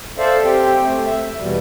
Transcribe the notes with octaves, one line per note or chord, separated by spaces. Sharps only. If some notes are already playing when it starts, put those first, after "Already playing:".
A4 C5 D5 E5 F5
C4 G4 G5
A3 C4
E5
E2 B2 G3